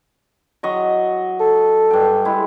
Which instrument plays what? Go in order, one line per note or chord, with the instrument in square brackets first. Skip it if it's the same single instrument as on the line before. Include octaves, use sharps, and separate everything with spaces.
[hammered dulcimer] F#3 D#5 C#6
[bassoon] A4
[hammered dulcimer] G2 G5
G#3 E4 C6